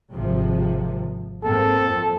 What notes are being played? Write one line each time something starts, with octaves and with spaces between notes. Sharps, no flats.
G#1 C3 F3
G#2 A#3 C4 A4
F2